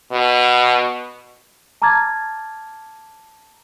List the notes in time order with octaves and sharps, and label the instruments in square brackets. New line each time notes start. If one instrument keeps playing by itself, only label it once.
[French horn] B2
[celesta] A5 A#5 D6 F6 G#6 A6